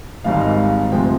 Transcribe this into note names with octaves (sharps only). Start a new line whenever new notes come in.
G#1 G#2 G3 F5
D#5
F5
D2 C3 F3 G#3 G5